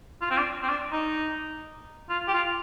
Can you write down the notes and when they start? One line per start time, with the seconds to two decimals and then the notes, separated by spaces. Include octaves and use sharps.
0.21 F4
0.31 C4
0.37 D4
0.63 C4
0.69 D4
0.92 D#4
2.10 F4
2.28 G4
2.34 F4